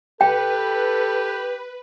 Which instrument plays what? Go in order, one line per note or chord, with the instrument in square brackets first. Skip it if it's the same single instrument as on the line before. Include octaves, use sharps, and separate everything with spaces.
[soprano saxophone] G4 [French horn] A4 [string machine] B4 [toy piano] G5